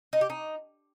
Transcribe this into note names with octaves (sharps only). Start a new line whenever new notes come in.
D#4
G4
D#4